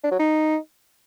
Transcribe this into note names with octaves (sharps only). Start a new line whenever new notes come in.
D4
F#3
D#4